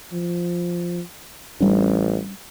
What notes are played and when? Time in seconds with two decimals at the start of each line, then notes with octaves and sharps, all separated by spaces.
0.12 F3
1.60 A1 G3 C#4 D4